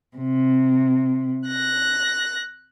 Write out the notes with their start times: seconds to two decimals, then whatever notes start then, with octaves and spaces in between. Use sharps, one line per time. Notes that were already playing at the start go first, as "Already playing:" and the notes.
0.17 C3
1.47 F#6 A#6